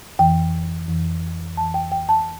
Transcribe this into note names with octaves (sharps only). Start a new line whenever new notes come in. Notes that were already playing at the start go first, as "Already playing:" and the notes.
F2 E3 G5
F2 E3
F2 E3 A5
G5
G5
A5